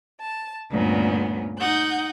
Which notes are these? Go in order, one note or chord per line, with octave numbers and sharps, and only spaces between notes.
A5
D2 G2 A#2 B3 C#4
D#4 F#5 G6